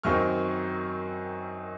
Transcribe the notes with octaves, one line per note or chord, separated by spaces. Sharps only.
F#2 D#3 F#3 C4 D#4 C#6 F6